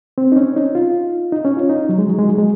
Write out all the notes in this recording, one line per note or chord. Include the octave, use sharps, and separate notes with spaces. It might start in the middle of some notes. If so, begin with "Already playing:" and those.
C4
D#4
C#4
D#4
F4
D#4
C#4
F4
D#4
F#3
G#3
F#3
G#3
F#3
G#3